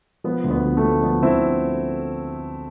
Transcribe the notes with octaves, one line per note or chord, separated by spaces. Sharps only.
F3 B3
D2
B3
D2
A3
F3
F3 B3
D2 C4 E4